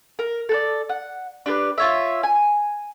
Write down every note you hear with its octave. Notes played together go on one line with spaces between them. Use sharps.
A#4
A4 B4 D5
F#5
D4 G4 A4 B4
F4 C#5 E5
G#5